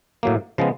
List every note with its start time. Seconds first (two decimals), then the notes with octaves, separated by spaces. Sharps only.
0.23 A2 F#3 A#3
0.58 C#3 F3 G#3 B3